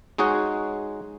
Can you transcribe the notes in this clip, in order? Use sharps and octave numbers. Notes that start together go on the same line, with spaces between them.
G#3 D#4 F#4 G#4 C#5 F#5